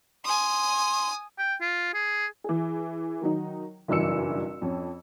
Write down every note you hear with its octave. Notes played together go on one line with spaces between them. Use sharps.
G#5 C6 D#6
G5
F4
G#4
E3 G#4
D#3 F#3 D#4
F#1 B1 G2 E3 E6 C#7
F2 C#4